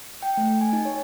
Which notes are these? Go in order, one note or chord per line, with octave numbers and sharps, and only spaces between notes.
G5
A3
G#5
D#4
C#5